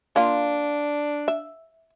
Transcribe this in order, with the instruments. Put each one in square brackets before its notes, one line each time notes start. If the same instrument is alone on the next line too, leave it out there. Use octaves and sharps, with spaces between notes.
[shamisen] A#3 F4 [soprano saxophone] D4
[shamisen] E5